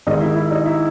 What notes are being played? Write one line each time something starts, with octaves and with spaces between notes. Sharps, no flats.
G#2 D#3 D#4
E4
E4
D#4
E4